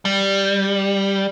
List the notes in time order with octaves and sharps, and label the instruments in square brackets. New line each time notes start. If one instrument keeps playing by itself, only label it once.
[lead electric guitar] G3